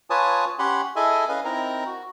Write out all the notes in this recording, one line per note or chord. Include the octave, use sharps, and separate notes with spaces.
F4 B4 C#5 G#5 A5 D#6
C#4 G4 C#5 F#5 B5 C6
E4 G#4 A4 D#5 E5 G#5
C#4 B4 D#5 F5 G#5
C4 D#4 E4 A#4 A#5
F#4